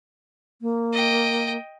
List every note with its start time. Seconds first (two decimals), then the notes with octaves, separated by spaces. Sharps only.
0.62 A#3
0.93 D#5 G5